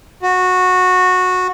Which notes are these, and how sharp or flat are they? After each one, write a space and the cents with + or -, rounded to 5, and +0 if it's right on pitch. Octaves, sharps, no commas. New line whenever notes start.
F#4 -15